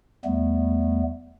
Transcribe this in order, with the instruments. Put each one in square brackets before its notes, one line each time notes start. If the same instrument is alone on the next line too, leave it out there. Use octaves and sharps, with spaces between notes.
[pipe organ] E2 G3 A3 B3